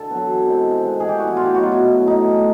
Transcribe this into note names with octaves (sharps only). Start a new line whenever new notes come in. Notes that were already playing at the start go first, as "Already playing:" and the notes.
Already playing: D3 A4
F#3 B3
E3
G#3 C4 D#4
C3
D#3 G#3 B3
E3 G#4
G4
G3 B3 F#4
E4
A2 F4
G4
F#3 B3 D#4 F#4
F4
B2 E4
F#3 A3
A2 D#4
E3 A3